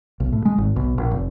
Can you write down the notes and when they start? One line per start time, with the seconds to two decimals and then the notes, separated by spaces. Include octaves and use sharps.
0.20 B1
0.33 A2
0.45 G#3
0.58 G#1
0.76 B1
0.98 A#1
1.11 F1